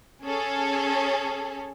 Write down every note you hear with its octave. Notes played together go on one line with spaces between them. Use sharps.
C#4 G#4 A4 C#5